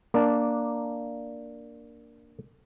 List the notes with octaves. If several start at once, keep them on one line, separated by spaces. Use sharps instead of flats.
A#3 D4 A5